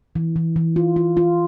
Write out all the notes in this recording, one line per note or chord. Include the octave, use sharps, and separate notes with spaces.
E3
E3
E3
F4
F4
F4